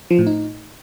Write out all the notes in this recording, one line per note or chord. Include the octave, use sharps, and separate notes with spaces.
F3
A2
D#4